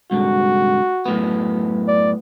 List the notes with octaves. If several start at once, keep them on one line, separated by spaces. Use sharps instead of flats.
C2 G#2 D3 F#4
F#2 A2 B3
D5